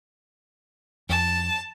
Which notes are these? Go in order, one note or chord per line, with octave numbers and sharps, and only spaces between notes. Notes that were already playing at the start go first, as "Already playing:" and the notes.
F2 A5